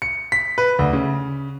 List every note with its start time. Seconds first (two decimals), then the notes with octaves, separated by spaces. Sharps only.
0.02 C#7
0.32 B6
0.58 B4
0.79 D2
0.93 C#3